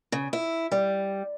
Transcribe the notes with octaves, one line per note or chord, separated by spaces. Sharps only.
C#3
E4
G3